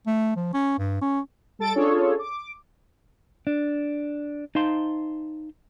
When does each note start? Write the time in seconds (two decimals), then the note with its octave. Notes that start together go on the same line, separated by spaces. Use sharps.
0.07 A3
0.36 F3
0.53 C#4
0.79 G2
1.02 C#4
1.59 G3 A4 A6 D7
1.75 C#4 D4 F4 G#4 A4 C#5
2.19 D6
3.47 D4
4.55 D#4 C5 F5 A5 C6